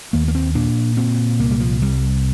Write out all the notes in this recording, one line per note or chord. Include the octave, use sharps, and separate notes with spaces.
D#2 A#3
A#3
C4
A#2 D4
A#2 C4
C2 A#3
G3
F3
C2 G3